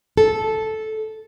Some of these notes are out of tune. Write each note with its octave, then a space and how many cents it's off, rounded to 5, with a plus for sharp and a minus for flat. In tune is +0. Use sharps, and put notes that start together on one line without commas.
A4 -10